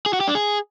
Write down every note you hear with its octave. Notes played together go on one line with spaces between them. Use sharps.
G#4
F#4
G4
D4
G#4